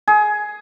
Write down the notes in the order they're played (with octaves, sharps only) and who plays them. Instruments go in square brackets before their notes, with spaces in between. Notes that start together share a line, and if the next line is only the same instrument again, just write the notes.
[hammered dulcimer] G#4